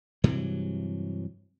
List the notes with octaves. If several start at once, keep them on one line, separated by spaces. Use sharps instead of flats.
G2 C3 E3 F#3